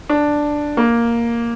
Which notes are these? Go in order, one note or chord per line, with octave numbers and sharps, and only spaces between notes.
D4
A#3